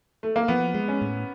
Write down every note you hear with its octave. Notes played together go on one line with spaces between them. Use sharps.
A3
A#3
F3 B3
G#3
C#4
A2